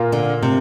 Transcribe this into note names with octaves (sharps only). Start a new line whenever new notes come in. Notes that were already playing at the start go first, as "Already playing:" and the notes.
Already playing: A#2 A#3 F4
D3
C3